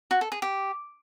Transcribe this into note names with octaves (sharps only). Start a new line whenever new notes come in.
F#4
A4
G#4
G4